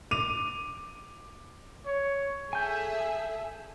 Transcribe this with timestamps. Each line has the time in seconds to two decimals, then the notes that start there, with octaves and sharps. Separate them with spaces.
0.11 D6 D#7 F7
1.86 C#5
2.53 G#4 A4 E5 G#5 G6